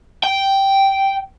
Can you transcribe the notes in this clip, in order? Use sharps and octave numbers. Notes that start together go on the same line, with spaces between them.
G5